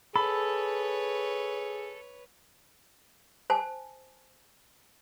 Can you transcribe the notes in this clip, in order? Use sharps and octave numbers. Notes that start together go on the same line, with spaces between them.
G#4 A4 B4 C#5 B5
C5 G#5 A5